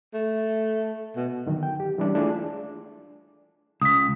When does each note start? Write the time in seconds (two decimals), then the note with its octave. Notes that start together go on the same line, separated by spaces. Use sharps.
0.14 A3
1.16 B2
1.46 D3 D#3 F#3
1.63 G5
1.80 G4
1.98 E3 G3 G#3 C#4 D4
2.15 A3 D4 E4 F4 G#4
3.81 C#2 D#6 B6